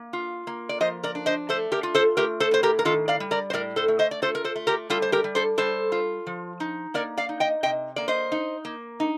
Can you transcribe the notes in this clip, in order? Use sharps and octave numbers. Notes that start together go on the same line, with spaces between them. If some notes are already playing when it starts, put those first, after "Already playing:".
Already playing: A#3
F4
A#3
D5
F3 C5 D#5
A#4 D5
D4
C5 D#5
A3 A4 C5
G4 A#4
F4
A4 C5
A3 G4 A#4
A4 C5
A2 C5
G4 A#4
A#4
D#3 F4 A4
D5 F5
G3
A#4 D5
C5
A2 A#4 D5
A4 C5
A3
C5 D#5
D5
F4 A4 C5
A#4
A4 C5
A3
G4 A#4
G3 F4 A4
C5
G4 A#4
G3
A4 C5
G3 A4 C5
F4
F3
D#4
A#3 A#4 D5
D5 F5
D#4
D#5 G5
C3 D#5 G5
A#3 D5
C5 D#5
D#4
A#3
D#4